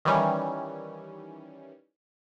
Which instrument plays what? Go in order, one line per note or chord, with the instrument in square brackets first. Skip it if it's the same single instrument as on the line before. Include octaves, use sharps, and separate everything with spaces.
[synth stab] D#3 E3 G3 C#4